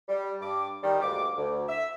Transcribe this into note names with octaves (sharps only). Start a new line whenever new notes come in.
G3
G2 D6
D#3 G3
D2 G2 G#3 A#3 D6
D2
E5